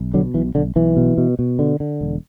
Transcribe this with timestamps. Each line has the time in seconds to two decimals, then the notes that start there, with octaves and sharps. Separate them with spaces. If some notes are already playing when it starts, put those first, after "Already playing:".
Already playing: B1
0.14 B2 D3 F#3
0.34 B1 E3
0.55 B1 D3
0.76 B1 E3
0.97 B2
1.18 B2
1.39 B2
1.59 D3
1.80 D3
2.01 E1